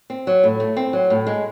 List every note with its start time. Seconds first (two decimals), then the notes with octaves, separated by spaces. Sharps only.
0.10 C4
0.27 F#3
0.44 A2
0.60 A3
0.77 C4
0.93 F#3
1.10 A2
1.27 G#3